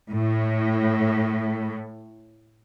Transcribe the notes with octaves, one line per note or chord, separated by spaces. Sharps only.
A2